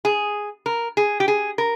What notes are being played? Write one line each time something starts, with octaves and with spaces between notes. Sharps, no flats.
G#4
A#4
G#4
G4
G#4
A#4